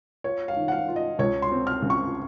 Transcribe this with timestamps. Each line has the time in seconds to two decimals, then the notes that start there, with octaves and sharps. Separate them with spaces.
0.24 F4 C#5
0.48 F5
0.56 D#3
0.68 F#5
0.72 F5
0.88 F4
0.96 D#5
1.19 C#2 C#5
1.42 C6
1.51 C4
1.67 F6
1.82 C#3
1.90 C#6